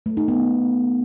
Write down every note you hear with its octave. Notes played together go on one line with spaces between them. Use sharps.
A3
D#4
B3